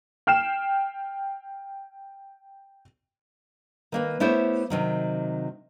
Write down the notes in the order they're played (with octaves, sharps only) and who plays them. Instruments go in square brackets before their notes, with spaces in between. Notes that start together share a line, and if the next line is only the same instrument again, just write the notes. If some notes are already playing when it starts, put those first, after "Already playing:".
[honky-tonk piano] G5 F6 C7 E7
[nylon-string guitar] D#3 A#3 B4
A3 B3 E4 G4 C5 C#5
C3 D#3 F#3